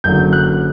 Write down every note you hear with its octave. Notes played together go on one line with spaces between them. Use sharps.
F#1 F#2 D3 F#3 G6
F#6